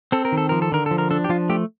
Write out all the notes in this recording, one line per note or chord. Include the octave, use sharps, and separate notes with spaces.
C4 A4
A#4
D#3
A4
F3 A#4
A4
D3 A#4
F3 A4
A#4
D4 A4
G4
F3 F4
A3 G4